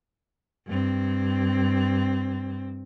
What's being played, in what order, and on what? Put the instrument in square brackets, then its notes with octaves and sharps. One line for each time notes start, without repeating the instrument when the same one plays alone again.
[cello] G2 C4